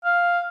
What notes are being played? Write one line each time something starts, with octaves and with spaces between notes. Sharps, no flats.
F5